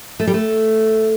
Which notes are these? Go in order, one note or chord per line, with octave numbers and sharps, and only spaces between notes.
A3
G3
A3